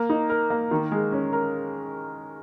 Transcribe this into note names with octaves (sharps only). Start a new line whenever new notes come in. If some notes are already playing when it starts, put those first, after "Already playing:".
Already playing: A#3
D#4
A#4
A#3
D#3
G#3
C#4
A#4